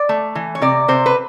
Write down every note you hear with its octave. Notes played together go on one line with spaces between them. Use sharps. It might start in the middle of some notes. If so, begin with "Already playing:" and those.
Already playing: D5
A3
E3
C#5
C3 D5
C3 C5
B4